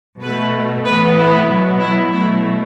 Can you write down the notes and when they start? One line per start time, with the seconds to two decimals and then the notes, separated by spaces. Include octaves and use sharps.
0.21 B2 B4
0.26 A3
0.85 A2 E3 B3 B4
1.17 E4
1.48 B2 F#3 B3
1.80 E4
2.12 B2 F#3 A3 E4